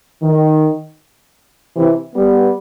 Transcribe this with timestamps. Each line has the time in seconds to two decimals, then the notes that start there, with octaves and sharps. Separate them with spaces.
0.22 D#3
1.76 C3 E3
2.15 G3 B3